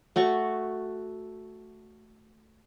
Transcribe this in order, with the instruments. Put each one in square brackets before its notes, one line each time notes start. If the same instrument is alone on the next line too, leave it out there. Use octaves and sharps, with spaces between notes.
[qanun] A3 F#4 C#6